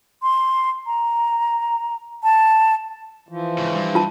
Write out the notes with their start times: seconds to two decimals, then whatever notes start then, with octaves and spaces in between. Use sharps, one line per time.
0.23 C6
0.87 A#5
2.23 A5
3.29 E3 F3
3.58 G#2 C#3
3.75 G2
3.95 F4 A5